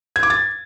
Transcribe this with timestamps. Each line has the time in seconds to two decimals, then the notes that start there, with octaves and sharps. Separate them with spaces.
0.16 G#6
0.23 D6
0.30 A6